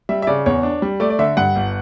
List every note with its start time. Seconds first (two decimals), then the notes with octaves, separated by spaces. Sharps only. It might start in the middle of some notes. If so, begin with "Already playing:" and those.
0.09 G3 E5
0.22 E5
0.27 C#3 D5
0.46 E2 C#5
0.63 D4
0.82 G3
1.00 A3 D5
1.10 D5
1.19 D3 E5
1.37 G2 F#5
1.56 G1